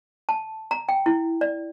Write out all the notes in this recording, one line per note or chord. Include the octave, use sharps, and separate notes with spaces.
A5
A#5
G5
E4
D5